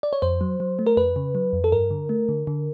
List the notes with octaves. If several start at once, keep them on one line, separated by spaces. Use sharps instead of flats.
D5
C#5
F2 C5
F#3
F#3
A3
A#4
F2 B4
C#3
F#3
F2
A4
G2 A#4
D3
A3
D3
D3